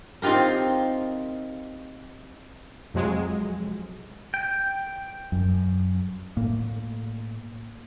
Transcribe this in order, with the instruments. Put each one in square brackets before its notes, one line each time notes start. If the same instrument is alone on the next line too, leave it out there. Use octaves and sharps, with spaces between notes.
[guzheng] C4 D#4 F4 G4 A#4
[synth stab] F2 C3 F#3 G#3
[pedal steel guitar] G5
[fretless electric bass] F#2
[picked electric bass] A2 A#3